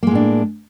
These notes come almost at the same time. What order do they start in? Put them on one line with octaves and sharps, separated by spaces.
A#3 G#3 A2 D4